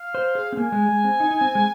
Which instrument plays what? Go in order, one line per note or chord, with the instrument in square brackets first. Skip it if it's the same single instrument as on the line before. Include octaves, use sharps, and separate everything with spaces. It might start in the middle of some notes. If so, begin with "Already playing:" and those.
Already playing: [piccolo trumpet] F5
[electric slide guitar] C5
G#4
C4
[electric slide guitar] A#3 [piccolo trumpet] G#5
[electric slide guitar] G#3
G#3
C4
D#4
D#4
C4
G#3